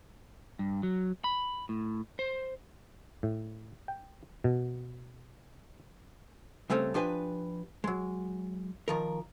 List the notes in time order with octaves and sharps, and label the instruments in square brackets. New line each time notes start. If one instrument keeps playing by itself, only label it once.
[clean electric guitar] G2
F#3
B5
A2
C5
[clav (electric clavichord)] A2
G5
B2
[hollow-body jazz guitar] C#3 G3 A3 C4 C#4
F3 D4 G4 B4 G#5
F#3 G#3
D#3 F3 A#4